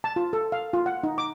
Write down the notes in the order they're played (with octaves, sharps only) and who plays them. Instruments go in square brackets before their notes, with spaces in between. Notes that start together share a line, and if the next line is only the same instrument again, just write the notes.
[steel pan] A5
F4
A4
F5
F4
F#5
D#4
D6